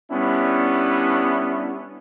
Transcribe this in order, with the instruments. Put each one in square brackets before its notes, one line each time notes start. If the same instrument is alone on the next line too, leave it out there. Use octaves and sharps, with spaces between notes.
[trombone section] G3 B3 C#4 D4 E4